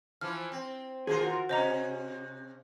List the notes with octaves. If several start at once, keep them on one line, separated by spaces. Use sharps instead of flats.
E3 F3 F6
C4
D#3 F4 G#4 A#4 C5
F#4
C3 C#4 C5 D#5 A#5